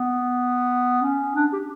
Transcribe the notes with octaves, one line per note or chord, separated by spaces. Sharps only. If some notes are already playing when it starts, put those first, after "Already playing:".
Already playing: B3
C#4
D4
G4